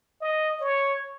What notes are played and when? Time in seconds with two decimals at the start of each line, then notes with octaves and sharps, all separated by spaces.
0.21 D#5
0.60 C#5